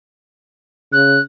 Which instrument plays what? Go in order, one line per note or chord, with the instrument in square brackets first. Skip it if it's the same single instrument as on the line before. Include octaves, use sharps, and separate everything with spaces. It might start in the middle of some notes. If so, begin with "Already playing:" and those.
[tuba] C#3 [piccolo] F#6